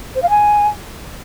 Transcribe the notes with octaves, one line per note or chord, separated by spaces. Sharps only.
C5
F5
G#5